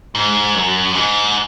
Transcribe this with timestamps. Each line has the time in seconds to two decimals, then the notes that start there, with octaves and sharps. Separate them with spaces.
0.15 G#2
0.55 F#2
0.95 G#2